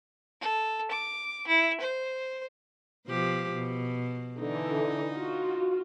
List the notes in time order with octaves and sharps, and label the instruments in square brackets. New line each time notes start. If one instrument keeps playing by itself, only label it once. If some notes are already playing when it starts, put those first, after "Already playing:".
[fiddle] A4
D6
E4
C5
[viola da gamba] B2 F3 G4
B2
[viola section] D3 E3 [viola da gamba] D#4
[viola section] F4 F#4